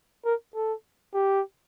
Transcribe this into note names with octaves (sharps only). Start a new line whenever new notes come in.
A#4
A4
G4